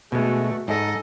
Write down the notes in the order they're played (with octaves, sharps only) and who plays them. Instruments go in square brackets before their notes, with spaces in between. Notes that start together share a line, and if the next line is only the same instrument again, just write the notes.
[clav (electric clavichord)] B2 G#3 [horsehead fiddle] A3 F#4
[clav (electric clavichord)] G#2 [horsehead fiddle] A4 D#5